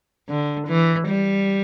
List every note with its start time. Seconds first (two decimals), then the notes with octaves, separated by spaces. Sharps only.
0.29 D3
0.68 E3
1.08 G3